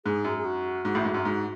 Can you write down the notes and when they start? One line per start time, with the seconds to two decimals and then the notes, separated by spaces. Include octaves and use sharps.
0.05 G#2 G#4
0.24 F#2
0.38 G#4
0.45 F#4
0.85 G#2
0.95 A1 A2
1.05 G#2
1.14 F#2
1.25 G#2